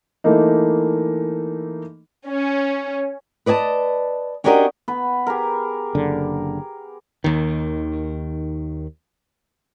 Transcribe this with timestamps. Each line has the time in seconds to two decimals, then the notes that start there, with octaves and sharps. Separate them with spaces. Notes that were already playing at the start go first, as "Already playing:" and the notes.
0.24 E3 A3 A#3 D#4
2.27 C#4
3.46 B4 D5 D#5 G#5 A5
4.44 C#4 D4 F#4 G4 A#4 D#5
4.88 B3 B4
5.27 G4 G#4 A#4
5.95 F#1 D3
7.24 D#2 D#3